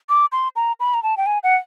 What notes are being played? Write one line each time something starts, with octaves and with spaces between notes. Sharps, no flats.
D6
C6
A#5
B5
A#5
A5
G5
G#5
F#5